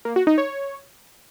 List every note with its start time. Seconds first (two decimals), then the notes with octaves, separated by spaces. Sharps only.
0.05 A#3
0.16 F#4
0.27 D#4
0.38 C#5